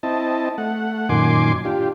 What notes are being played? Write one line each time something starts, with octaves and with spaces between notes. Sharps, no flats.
C4 E4 D#5 A5
A3 F#5
F#2 A#2 D#3 G#5 C6 D6
D4 F4 G4